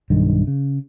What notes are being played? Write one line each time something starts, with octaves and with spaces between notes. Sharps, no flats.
B1 G2 D#3
C#3